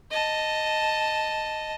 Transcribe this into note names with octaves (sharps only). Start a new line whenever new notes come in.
D#5 A5